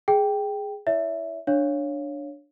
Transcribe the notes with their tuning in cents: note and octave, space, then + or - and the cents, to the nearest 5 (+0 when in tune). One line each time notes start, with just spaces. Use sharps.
G#4 +0 G5 +0
E4 -5 C#5 +35 E5 +0
D4 +0 C#5 +0 F5 +0